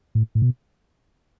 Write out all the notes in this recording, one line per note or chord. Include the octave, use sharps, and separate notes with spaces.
A2
A2
B2